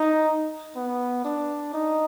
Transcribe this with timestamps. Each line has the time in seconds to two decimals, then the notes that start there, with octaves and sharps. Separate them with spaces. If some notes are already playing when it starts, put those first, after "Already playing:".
Already playing: D#4
0.75 B3
1.24 D4
1.73 D#4